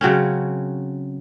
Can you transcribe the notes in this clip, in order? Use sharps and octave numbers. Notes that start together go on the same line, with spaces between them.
C#3 F#3 C4 C#4